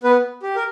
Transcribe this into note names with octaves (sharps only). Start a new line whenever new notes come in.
B3 B4
G4
A#4